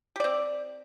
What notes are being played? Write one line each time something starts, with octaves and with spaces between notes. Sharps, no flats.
C4 G4 D5